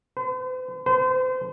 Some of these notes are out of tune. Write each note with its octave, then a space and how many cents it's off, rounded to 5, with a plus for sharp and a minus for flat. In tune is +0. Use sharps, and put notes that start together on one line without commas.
C5 -45
C5 -35